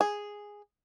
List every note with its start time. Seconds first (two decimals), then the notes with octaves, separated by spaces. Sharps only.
0.01 G#4